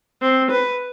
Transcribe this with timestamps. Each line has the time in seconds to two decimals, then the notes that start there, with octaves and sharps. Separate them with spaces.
0.22 C4
0.51 B4